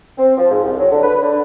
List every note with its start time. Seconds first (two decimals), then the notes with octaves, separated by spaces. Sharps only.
0.18 C4
0.38 F3
0.51 G#2
0.63 C2
0.80 F#3
0.91 D3
1.03 B4
1.22 D3